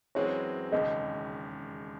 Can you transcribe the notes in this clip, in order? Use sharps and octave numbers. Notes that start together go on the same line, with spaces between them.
F#2 E3 G#3 C4 F#4 C#5
E1 D#2 C#3 D#5